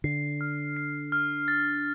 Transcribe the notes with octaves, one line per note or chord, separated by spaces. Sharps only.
D3 C7
F6
C7
F6
A6